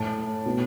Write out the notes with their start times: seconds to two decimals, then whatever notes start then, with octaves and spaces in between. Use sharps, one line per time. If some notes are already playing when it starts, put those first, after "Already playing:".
Already playing: A2 A3 A5
0.46 B2 B3